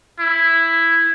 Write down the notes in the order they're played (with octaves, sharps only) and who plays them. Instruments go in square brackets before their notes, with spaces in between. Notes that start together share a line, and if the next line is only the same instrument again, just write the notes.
[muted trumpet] E4